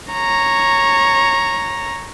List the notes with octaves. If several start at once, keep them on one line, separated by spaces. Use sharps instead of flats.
C#5 A#5